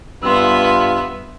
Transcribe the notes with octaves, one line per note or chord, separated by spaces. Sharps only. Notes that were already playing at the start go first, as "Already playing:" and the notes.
G2 B3 F4 E5 C6 E6